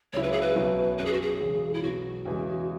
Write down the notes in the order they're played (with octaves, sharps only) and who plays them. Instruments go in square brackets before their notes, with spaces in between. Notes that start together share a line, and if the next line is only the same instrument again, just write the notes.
[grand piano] C#2 C#3 F#3 E4 [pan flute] C#5
[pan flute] B4
G#4
B4
[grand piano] B1 B2 F#3 C#4 E4
[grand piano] F#2 F#3 C#4 [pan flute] B4
[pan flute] G#4
F#4
G#4
[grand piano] E1 E2 C#3 F#3
[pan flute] E4
[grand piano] B1 B2 F#3 B3 [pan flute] F#4
[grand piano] E2 C#3 E3 G#3